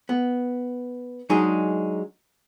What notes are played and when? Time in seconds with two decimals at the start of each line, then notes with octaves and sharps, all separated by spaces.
0.09 B3
1.30 F#3 G#3 D4 D#4 G#4